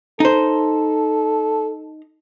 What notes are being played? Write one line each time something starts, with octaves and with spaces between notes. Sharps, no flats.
D#4 A4 C5